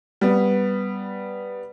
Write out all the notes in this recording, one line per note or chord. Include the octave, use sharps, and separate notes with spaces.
G3 B3